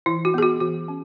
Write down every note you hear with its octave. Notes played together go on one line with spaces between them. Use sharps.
E3 E4
F#4
B3 G#4
F#4
E3 F#4
C#4